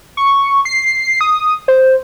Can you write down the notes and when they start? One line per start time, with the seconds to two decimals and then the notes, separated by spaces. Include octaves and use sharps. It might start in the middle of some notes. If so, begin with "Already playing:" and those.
0.17 C#6
0.65 C7
1.21 D#6
1.68 C5